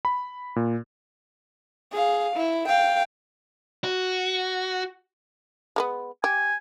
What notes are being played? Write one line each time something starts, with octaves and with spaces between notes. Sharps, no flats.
B5
A#2
G#4 F5
E4
F5 G5
F#4
G#3 A#3 B3
G4 G#5